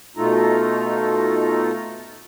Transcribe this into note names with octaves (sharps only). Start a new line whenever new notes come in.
B2 A3 D#4 F4 A4 A#5